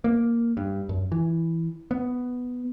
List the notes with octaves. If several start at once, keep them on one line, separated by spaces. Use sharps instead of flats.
A#3
G2
F#2
E3
B3